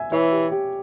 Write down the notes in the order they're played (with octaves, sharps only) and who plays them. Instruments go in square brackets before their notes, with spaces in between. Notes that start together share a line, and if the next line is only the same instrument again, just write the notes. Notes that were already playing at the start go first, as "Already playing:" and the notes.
Already playing: [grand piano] E5 G#5
[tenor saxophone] E3 [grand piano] C#5 E5
[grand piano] G4
G4